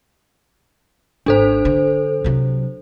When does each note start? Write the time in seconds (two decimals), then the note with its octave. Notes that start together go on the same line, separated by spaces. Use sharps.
1.26 G#1 D4 A4 C5
1.65 D3
2.24 C3 F#3